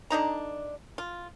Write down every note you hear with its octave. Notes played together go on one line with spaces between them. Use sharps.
D3 D4 D#4 A#5
F4